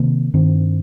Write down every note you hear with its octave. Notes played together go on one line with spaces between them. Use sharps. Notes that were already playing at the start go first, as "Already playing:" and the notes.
Already playing: C3 D#3 A#3
G2 D#3 C4